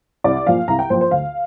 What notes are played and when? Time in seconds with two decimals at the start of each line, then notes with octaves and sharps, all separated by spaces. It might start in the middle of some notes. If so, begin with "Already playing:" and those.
0.24 C2 D5
0.47 A#2 F3 F5
0.68 C2 A#5
0.79 G5
0.90 A#2 F3 C5
1.01 C5
1.11 D2 F5